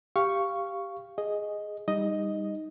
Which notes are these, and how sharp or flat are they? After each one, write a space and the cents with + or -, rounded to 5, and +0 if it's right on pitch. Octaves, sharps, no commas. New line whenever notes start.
G4 +0 F5 -10 C#6 +0
G#4 +0 D#5 +0
G3 +25 D#4 +0 D#5 +0